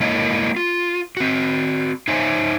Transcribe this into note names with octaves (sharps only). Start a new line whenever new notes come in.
G#3 A#3 E4 A#4 C#5 D#5
F4
C4 F#4
D#4 C5 C#5 E5 G#5